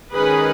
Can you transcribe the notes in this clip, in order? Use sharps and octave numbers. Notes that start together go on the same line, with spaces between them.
D#3 G#3 C#4 G#4 B4